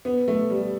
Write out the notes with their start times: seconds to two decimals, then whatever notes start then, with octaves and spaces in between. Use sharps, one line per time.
0.05 B3
0.28 A3
0.50 G3